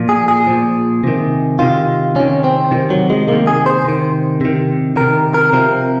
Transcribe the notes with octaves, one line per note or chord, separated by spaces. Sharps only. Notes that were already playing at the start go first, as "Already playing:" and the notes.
Already playing: A#2 F3
G#4
G#4
A#2 F3
C3 D#3
C3 D#3 F4
C3 D#3 C#4
C4
C3 D#3 F3
F#3
G#3
C3 D#3 A#3
G#4
C5
C3 D#3
C3 D#3
C3 D#3 A#4
A#4
C3 F3 A#4